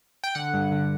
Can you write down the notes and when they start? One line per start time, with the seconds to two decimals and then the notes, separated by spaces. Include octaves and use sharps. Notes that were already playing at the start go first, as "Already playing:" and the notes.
0.24 G5
0.35 D3 F#5
0.54 G2
0.72 D3